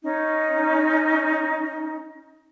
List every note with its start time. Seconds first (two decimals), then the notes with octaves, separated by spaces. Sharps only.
0.03 C#4 D#4